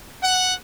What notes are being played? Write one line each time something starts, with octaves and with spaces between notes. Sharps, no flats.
F#5